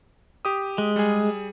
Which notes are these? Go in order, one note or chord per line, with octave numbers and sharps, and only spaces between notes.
G4 D#6
G#3
G3 G#4